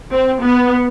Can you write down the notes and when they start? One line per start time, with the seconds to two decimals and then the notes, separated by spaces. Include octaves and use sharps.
0.12 C4
0.43 B3